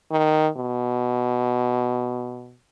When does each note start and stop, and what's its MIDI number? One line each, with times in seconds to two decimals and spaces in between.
0.11 0.48 51
0.57 2.55 47